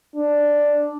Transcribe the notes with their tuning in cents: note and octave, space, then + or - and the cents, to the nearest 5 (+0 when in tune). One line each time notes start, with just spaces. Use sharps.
D4 +0